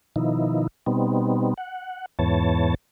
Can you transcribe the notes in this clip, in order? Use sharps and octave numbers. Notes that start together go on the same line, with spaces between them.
B2 D#3 F3 D#4 E4
B2 G3 B3 C4 D#4
F#5
E2 G#2 E3 B3 C#5 A5